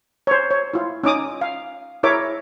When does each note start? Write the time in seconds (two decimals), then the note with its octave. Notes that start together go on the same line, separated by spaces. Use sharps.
0.27 C5 C#5
0.51 C#5
0.73 E4 F4
1.04 C#4 D#4 D6 D#6
1.41 F5
2.03 E4 G#4 A#4 C#5 E5 D6